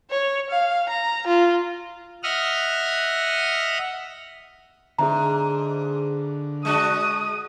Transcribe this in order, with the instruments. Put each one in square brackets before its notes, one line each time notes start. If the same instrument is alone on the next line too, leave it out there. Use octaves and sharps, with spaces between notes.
[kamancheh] C#5
F5
A#5
F4
[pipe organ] D#5 E5 F#5 D#6 F6
[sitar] G#2 [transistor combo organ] D3 [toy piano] G#4 E5 A#5
[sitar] G#3 D4 F#4 [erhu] D#6